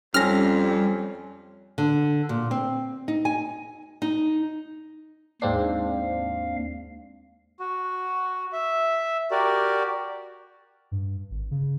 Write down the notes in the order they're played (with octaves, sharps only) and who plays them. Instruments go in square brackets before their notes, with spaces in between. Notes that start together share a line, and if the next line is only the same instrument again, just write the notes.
[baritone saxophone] F2 [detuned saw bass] G3 [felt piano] C#4 G#5 [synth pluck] F6 A#6
[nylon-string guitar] D3
A#2
C4
D#4
G#5
D#4
[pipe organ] D#2 F5 [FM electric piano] G#2 C4 D4
[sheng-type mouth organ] F#4
E5
F#4 G4 A#4 D5
[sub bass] G2
G#1
C#3